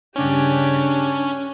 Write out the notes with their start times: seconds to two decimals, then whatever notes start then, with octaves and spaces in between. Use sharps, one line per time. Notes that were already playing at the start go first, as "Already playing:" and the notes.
0.16 G2 C#3 C#4 D4 G4